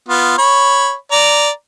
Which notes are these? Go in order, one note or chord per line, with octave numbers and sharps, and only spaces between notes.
B3 F4
C#5 B5
D5 A#5